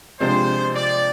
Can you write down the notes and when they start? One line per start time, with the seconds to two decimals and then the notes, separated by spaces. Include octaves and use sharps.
0.20 C3 F3 G#3 D4 C5
0.75 D5